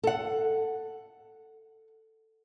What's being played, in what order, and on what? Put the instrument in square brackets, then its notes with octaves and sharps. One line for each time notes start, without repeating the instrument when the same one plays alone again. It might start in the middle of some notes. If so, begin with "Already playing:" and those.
[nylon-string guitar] A4 F#5